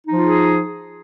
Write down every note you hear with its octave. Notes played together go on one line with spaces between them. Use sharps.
F3 D#4 F4 G#4